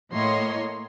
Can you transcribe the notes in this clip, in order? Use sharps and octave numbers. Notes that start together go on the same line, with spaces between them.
A2 A#3 C#5 D#5 C6